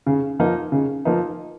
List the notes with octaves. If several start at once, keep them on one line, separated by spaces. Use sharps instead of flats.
C#3
F3 A#3 D#4
C#3
F3 A#3 D#4